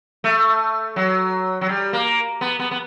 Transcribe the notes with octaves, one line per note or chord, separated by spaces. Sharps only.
A3
F#3
F#3
G3
A#3
B3
B3
B3